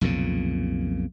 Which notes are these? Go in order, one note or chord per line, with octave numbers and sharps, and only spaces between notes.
B1 F2 A#2 C#3